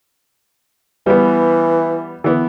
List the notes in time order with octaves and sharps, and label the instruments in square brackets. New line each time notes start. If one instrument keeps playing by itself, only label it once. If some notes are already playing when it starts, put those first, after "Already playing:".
[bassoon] E3 [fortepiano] G3 B3
[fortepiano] E3 B3